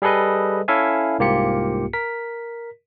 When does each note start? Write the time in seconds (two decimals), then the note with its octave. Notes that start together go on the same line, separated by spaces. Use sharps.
0.02 G3 G#4 A4 B4 D#5
0.68 C#4 E4 A4 E5 F5 G#5
1.19 C2 G#2 A#3 F4 G4 C#7
1.93 A#4 B6